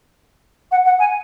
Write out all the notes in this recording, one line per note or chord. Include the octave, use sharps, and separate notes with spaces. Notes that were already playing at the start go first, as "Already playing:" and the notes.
F#5
F#5
G#5